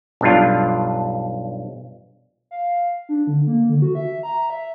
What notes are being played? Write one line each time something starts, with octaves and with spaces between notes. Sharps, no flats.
B1 G2 D4 F4
F5
D4
D3
A#3
D3
F#4
E5
A#5
E5